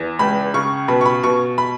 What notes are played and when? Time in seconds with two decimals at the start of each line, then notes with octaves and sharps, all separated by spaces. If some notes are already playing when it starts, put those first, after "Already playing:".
Already playing: E2
0.19 C#2 B5
0.54 C#3 C#6
0.88 B2 B5
1.01 C#6
1.06 B5
1.23 B2 C#6
1.58 B5